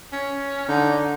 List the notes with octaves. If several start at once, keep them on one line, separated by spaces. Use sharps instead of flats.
C#4
D3 D#4